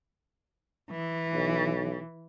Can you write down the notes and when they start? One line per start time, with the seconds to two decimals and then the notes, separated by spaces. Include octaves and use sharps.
0.90 E3
1.34 B1